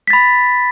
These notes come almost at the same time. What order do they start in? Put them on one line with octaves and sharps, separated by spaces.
B6 A6 B5